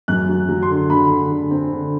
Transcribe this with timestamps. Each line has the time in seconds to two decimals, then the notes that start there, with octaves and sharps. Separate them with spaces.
0.08 F#2 F#6
0.29 F#3
0.49 F#3
0.62 C6
0.69 D3
0.90 D3 B5
1.10 D3
1.31 D3
1.51 C4
1.72 D3